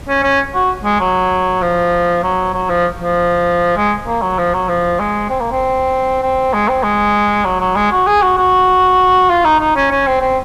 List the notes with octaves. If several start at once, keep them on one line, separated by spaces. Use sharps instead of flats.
C#4
C#4
F#4
G#3
F#3
F3
F#3
F#3
F3
F3
G#3
A#3
F#3
F3
F#3
F3
G#3
C4
A#3
C4
C4
G#3
C4
G#3
F#3
F#3
G#3
F#4
G#4
F#4
F#4
F4
D#4
D#4
C#4
C#4
C4
C4